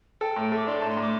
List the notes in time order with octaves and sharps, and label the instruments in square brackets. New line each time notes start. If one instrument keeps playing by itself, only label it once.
[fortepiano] A4 [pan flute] G5
[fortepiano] A2
[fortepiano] A3 [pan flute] D6
[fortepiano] D4 [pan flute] C6
[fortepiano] A2 [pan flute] A5
[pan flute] C6
[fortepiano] A2 [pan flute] D6